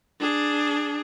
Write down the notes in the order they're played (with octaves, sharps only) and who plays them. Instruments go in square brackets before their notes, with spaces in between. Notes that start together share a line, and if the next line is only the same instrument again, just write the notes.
[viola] D4 G#4